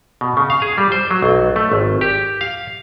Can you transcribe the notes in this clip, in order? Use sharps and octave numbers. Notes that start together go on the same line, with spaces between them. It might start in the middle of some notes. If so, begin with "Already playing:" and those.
B2
C#3
F5
G#4
G3
C5
F#3
B1
A3
G#1
G4
F5